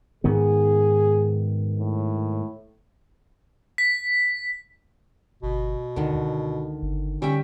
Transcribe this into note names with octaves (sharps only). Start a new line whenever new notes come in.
G#2 D#3 B3 G#4
A2
B6
G1 B2
C#2 D3 D#3
C#2
G1
D3 G3 C#4 E5 G5